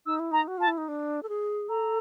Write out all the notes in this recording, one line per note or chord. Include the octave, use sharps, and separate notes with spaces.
D#4 E6
E4
D#4 A#5
F#4
F4 A5
E4
D#4
D4
A4
G#4
A4 A#5